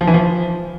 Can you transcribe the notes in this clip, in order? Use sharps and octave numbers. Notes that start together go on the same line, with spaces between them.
F3
E3
F3